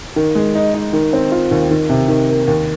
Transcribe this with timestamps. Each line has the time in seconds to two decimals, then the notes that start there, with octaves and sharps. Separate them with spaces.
0.16 D#3
0.35 G#3
0.55 D#4
0.74 D#4
0.93 D#3
1.13 C4
1.32 F4
1.51 D#2
1.71 D#3
1.89 C3
2.08 D#3
2.28 A#3
2.47 D#2